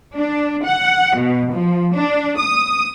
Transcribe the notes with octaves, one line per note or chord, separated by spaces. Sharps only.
D4
F#5
B2
F3
D4
D#6